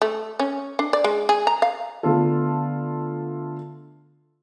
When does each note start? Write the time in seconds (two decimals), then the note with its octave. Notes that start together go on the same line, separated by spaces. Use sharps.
0.02 A3
0.40 C#4
0.79 D4
0.93 D5
1.04 G#3
1.29 G#4
1.47 A#5
1.62 F5
2.03 D3 A3 B3 F4 A4